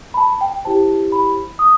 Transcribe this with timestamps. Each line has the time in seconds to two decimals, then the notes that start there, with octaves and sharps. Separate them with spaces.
0.14 B5
0.17 A5
0.41 G5
0.65 E4 G4 C5 A5
1.12 B5
1.59 D#6